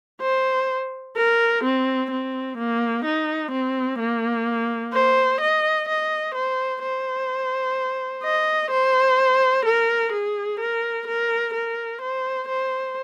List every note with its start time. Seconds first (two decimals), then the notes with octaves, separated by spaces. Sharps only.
0.21 C5
1.16 A#4
1.64 C4
2.11 C4
2.58 A#3
3.05 D#4
3.52 C4
4.00 A#3
4.93 C5
5.41 D#5
5.89 D#5
6.35 C5
6.82 C5
8.24 D#5
8.71 C5
9.66 A#4
10.12 G#4
10.60 A#4
11.07 A#4
11.54 A#4
12.01 C5
12.48 C5